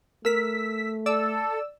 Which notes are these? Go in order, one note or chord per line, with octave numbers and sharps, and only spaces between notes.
A3 A#4 E6 B6
A4 D5 E6